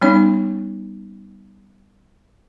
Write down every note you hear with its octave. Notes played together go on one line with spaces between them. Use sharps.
G3 B3 C#4 D#4 C#5